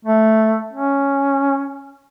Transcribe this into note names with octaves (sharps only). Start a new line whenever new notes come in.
A3
C#4